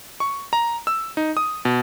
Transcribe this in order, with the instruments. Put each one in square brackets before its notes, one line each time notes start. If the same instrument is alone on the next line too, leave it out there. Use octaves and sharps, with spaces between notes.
[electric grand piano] C#6
A#5
E6
D#4
D#6
B2